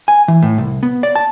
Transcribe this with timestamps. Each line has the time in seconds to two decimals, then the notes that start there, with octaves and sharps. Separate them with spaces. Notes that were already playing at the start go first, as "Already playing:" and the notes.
0.08 G#5
0.28 E3
0.43 A2
0.58 C2
0.83 B3
1.03 D5
1.15 A5